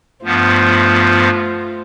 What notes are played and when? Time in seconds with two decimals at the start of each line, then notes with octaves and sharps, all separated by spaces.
0.25 G2 F3 A3 B3 F4 C5